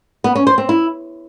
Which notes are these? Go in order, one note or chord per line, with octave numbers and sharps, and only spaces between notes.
B3
C#4
C5
C4
E4